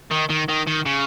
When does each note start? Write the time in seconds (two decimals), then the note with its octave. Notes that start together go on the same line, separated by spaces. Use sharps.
0.11 D#3
0.30 D#3
0.49 D#3
0.67 D#3
0.86 C#3